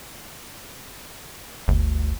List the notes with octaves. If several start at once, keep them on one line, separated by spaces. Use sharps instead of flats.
G1 D2